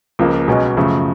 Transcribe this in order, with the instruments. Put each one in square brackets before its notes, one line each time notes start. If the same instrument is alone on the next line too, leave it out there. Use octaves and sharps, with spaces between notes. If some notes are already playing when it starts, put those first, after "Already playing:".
[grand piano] C#2 C#3 F3 A#3
B1 B2 G#3 C#4
F#2 C#3 F3 A3